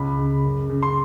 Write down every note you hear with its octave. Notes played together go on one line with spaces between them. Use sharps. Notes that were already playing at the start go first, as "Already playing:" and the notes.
Already playing: C#2 B5
C#3
F#2
C#3
C6